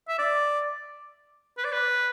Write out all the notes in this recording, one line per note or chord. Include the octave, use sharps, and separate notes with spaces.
E5
D5
B4
D5
B4